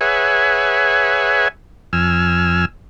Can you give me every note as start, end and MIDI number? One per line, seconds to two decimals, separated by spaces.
0.01 1.48 68
0.01 1.48 71
0.01 1.48 73
0.01 1.48 76
0.01 1.48 78
0.01 1.48 80
1.93 2.65 41
1.93 2.65 80
1.93 2.65 88
1.93 2.65 89